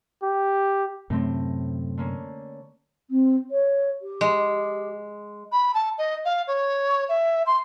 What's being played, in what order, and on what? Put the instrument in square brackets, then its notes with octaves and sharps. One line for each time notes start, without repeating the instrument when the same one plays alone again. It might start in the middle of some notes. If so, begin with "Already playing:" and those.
[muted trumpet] G4
[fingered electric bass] F#2 C3 [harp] A2 A3 C4
[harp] D3 A#3 C#4
[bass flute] C4
C#5
G4
[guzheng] G#3
[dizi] B5
A5
D#5
F5
C#5
E5
C6